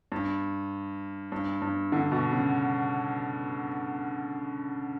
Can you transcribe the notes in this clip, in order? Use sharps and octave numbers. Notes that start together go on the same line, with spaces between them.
G2
G2
G2
D3
B2
C#3